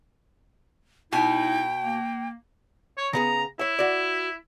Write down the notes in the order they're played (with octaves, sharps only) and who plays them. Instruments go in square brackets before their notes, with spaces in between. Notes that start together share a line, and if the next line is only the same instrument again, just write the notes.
[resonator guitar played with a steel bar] B2 G#5 [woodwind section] D#4 E4 [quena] G5
[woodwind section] A#3
[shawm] C#5
[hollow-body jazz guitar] C#3 B3 G#4 [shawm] A#5
[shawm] E4 [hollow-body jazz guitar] C#5 E5
[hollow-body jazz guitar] F#4 D5